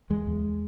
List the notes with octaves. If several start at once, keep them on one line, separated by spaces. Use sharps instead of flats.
E2 G#3
E2